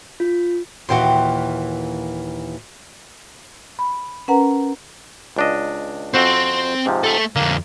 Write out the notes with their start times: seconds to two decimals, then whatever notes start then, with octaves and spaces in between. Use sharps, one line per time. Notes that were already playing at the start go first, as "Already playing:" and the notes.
0.20 F4
0.89 D#2 A#2 E3 F#4 G5 C6
3.79 B5
4.28 C#4 A#4 B4 F#5 A#5
5.36 C#2 D4 D#5
6.14 F2 C4 F#4 C5
6.86 G#2 C3 F3
7.04 A3 A4
7.36 F2 D3 A#3